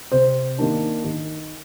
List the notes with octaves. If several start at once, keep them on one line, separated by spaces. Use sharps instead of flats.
C3 C5
D#3 A#3 D4
D#3